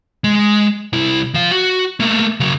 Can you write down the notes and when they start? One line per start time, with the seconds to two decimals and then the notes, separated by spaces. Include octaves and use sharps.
0.24 G#3
0.93 C2 E4
1.34 F3 F5
1.51 F#4
2.00 A3 A#3
2.40 C#3 F#3